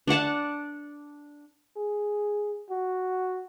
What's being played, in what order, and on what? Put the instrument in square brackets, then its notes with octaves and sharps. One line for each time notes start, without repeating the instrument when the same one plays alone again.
[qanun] D4 D5 F#5 A5
[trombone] G#4
F#4